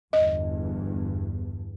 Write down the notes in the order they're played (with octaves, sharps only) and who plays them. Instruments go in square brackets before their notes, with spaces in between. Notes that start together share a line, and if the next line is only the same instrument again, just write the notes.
[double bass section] G1 E2 G2 [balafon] D#5